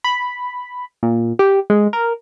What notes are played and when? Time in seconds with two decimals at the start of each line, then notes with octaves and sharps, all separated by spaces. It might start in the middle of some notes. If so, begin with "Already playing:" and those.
0.04 B5
1.03 A#2
1.39 G4
1.70 G#3
1.93 A#4